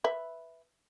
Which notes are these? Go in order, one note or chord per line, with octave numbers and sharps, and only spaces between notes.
B4 E5